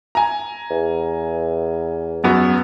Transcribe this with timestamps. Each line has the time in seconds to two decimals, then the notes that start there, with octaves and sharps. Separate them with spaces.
0.15 G#5 A#5
0.70 E2
2.24 F#2 B3 F#4